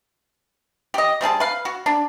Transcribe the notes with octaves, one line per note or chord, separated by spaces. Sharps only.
G4 D#5
G3 C4 G#4 A5
B4 F5
F#4
D4